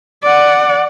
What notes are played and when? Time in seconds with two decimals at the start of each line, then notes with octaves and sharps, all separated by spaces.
0.23 D5 F#5